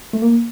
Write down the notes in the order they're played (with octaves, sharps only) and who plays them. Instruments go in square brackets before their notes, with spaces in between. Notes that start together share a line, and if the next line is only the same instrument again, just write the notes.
[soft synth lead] A3
A#3